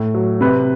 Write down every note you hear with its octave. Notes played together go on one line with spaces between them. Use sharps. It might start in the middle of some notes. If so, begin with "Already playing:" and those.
Already playing: A2
F#3
C3 B4